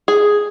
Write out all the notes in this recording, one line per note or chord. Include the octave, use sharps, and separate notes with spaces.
G#4